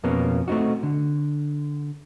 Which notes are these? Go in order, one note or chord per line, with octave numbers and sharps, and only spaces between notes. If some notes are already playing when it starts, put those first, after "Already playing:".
F2 B2 A#3 B3 C#4
A3 C4 D#4 F#4
D3